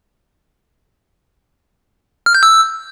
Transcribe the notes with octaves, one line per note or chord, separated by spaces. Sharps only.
F6
G6
E6